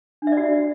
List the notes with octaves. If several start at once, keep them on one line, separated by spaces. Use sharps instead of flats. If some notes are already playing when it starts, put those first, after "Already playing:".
D4
E5
D5
F#4